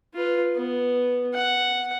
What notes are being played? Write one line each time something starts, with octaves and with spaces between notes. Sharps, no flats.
F4 B4
B3
F#5